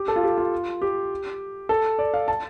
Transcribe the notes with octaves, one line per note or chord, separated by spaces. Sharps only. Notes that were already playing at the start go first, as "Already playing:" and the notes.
Already playing: G4
A4
F4
G4
F4
G4
A4
D5
F5
A5